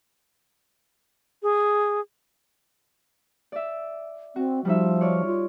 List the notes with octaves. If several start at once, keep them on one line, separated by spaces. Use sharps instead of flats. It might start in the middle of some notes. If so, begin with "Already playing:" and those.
G#4
D5 E5
C4 F#4
F3 G3 D#4 E5
C#5 D5 F6
F4